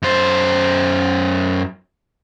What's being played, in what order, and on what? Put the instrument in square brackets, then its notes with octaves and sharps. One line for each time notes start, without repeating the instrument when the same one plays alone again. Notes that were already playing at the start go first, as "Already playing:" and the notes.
[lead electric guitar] F#2 C5